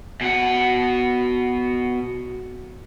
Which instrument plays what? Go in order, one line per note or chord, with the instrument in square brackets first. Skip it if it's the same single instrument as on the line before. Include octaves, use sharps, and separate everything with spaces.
[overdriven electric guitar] B2 F#5